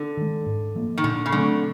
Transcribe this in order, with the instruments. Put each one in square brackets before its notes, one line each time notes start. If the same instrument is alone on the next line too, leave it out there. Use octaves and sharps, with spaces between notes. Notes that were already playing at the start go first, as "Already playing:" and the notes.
Already playing: [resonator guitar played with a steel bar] D3
[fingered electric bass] D#3 G#3
G#2
F3 A#3
[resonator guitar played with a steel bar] D#3
[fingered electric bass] A#2 [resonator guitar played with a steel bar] D3
[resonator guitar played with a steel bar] C#3
[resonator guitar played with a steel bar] D3 [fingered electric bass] F#3 A3 C4